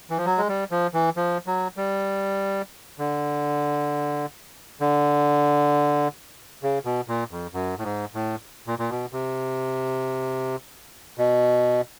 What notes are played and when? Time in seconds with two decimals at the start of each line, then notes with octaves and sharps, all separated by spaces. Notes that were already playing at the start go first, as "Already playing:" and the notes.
0.10 E3
0.18 F3
0.25 F#3
0.38 G#3
0.48 G3
0.71 F3
0.94 E3
1.17 F3
1.47 F#3
1.77 G3
2.98 D3
4.81 D3
6.63 C#3
6.85 B2
7.08 A#2
7.31 F2
7.54 F#2
7.79 A2
7.84 G#2
8.14 A2
8.67 A#2
8.79 A#2
8.90 B2
9.13 C3
11.18 B2